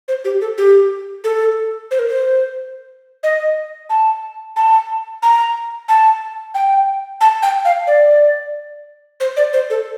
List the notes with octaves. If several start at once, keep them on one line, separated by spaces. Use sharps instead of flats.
C5
G4
A4
G4
A4
C5
A#4
C5
D#5
A5
A5
A#5
A5
G5
A5
G5
F5
D5
C5
D5
C5
A4